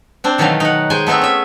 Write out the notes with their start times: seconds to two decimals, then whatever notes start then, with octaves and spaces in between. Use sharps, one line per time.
0.24 C4 D4 C5
0.38 B2 D#3 E3 F#3 A3 F5
0.60 D#4 F#5
0.90 G#3 G#4 C5 G#5
1.07 A3 B3 C4 G#4 E5
1.22 C#4 E5